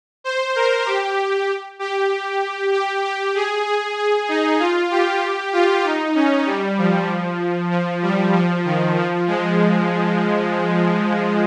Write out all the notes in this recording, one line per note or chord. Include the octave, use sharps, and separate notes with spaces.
C5
A#4
G4
G4
G4
G4
G#4
G#4
G#4
D#4
F4
G4
F4
D#4
C#4
G3
F3
F3
G3
F3
D#3
F3
G#3